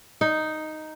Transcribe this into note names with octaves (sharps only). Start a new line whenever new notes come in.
D#4